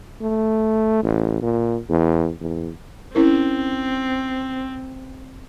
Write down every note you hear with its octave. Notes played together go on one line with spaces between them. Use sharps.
A3
A1
A#2
E2
E2
C4 C#4 E4 A#4